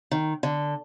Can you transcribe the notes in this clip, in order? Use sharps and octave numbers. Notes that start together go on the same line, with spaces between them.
D#3
D3